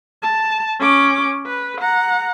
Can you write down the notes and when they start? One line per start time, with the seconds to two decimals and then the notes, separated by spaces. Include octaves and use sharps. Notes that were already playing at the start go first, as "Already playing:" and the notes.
0.23 A5
0.80 C#4 D6
1.46 B4
1.81 F#5 A#5